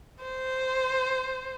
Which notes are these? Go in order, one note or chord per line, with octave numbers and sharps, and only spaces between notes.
C5